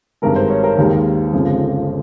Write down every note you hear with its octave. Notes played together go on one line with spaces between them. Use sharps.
G#1 G2 D#3 G#3 A#4
C5
C#5
A#4
D#2 D#3 G#3 G4
G1 F2 C#3 F3 G#3